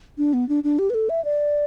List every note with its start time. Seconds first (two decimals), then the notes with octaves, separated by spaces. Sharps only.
0.18 D4
0.34 B3
0.49 D4
0.64 D4
0.79 G4
0.90 B4
0.94 A4
1.09 E5
1.25 D5